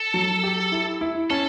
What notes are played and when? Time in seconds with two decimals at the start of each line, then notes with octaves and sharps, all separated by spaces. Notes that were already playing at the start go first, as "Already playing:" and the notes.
Already playing: A4
0.14 F#3
0.43 G4
0.72 E4
1.01 E4
1.30 C#4 A4